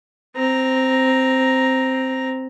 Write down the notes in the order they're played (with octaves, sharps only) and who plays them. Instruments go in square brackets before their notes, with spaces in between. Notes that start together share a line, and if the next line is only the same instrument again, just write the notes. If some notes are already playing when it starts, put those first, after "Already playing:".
[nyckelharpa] C4 A#5